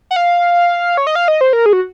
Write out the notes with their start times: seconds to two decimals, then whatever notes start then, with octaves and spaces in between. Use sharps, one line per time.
0.11 F#5
0.16 F5
0.97 C#5
1.07 D#5
1.15 F5
1.28 D#5
1.41 C5
1.53 A#4
1.66 G#4
1.73 F#4